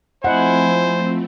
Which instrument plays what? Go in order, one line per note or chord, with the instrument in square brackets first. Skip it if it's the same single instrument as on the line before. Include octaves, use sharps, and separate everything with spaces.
[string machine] F3 A3 C4 [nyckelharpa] E4 G#5 [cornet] C5 [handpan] D#5 F#5